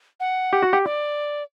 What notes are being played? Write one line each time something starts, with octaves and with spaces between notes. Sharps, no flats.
F#5
G4
F#4
G4
D5